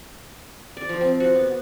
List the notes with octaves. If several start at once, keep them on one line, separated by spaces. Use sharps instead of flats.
D5
F3
C4
F#4
B3
B3